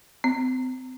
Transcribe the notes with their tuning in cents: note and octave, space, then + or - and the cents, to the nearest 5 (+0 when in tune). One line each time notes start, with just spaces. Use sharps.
C4 -35